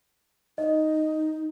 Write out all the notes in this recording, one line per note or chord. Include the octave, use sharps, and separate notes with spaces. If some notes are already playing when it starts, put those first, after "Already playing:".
D#4 D#5